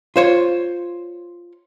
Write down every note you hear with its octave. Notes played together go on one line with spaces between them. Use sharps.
F4 C5 C#5